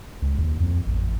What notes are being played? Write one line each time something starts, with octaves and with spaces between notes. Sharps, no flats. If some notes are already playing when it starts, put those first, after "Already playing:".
C#2
D#2
F2
A1